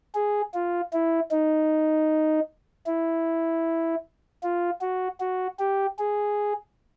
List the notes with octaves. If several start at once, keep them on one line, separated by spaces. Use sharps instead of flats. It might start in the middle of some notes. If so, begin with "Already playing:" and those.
G#4
F4
E4
D#4
E4
F4
F#4
F#4
G4
G#4